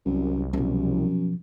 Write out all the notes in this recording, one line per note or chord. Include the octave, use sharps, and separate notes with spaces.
C2 F#2
F#2 B2 F3